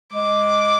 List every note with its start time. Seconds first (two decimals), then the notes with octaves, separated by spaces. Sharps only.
0.13 G#3 D6